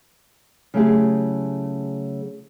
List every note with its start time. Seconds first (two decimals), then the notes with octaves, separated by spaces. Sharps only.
0.74 C#3 F#3 A3 E4 G4 G#4